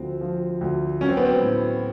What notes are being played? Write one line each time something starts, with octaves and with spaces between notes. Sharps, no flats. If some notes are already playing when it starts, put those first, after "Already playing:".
Already playing: D2 F3 C4
F3
D2
F#3 C#4
C4
B3
C4
A2